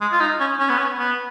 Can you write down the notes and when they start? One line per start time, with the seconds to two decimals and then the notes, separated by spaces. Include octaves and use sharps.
0.01 G#3
0.12 F4
0.20 D#4
0.39 C#4
0.59 C#4
0.69 B3
0.77 C#4
0.99 B3